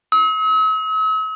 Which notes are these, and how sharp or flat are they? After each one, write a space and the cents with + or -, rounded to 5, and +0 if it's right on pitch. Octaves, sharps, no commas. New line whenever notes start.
E6 -45